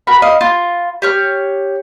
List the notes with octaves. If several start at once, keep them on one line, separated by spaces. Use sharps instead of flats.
F#4 A#4 B5
D#5 F5
F4
G4 C#5 F6